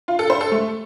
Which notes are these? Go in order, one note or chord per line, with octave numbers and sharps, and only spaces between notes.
F4
A4
C5
A4
A3